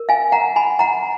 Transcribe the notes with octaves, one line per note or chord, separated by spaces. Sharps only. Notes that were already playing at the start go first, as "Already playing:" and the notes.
Already playing: A#4
F5 G#5
F#5 A#5
G#5 B5
F#5 A#5